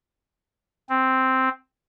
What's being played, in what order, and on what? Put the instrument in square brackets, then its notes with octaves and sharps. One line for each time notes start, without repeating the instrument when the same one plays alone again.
[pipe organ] C4